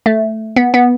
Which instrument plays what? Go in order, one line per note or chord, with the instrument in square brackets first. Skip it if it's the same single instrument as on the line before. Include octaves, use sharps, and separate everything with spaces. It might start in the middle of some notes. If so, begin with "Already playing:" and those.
[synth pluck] A3
B3
B3